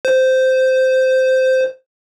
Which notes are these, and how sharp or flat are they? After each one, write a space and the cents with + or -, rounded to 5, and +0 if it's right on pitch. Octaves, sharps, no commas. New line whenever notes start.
C5 -10